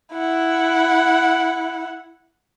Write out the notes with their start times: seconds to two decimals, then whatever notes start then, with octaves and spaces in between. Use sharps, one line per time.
0.14 E4 F#5